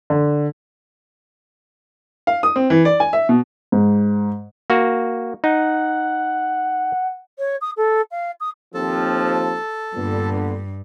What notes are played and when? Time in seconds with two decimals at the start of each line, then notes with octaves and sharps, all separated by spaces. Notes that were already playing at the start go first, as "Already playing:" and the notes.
0.10 D3
2.27 F5
2.43 D#6
2.56 C4
2.70 E3
2.85 D5
3.00 G#5
3.13 E5
3.29 B2
3.72 G#2
4.70 A#3 F#4
5.44 D#4 F#5
7.38 C#5
7.61 D#6
7.76 A4
8.11 F5
8.40 D#6
8.74 D#2 F3 C4 A4 A5
9.95 G2 A#2 D3 B3